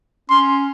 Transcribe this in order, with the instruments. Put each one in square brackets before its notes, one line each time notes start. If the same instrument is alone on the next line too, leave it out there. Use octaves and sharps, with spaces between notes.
[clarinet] C#4 [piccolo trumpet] C6